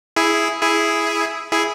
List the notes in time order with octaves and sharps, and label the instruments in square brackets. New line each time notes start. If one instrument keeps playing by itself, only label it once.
[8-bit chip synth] E4 G#4
E4 G#4
E4 G#4